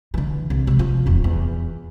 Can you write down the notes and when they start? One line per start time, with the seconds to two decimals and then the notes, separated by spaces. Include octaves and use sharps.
0.14 D3 E3
0.50 C2
0.67 C3 G3
0.79 F3
1.06 D#1 F2
1.24 E2